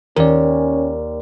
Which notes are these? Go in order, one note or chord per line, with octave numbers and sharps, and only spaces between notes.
D#2 C#4 A#4 D5